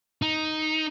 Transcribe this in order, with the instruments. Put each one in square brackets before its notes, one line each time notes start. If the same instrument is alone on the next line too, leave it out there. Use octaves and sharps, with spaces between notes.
[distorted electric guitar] D#4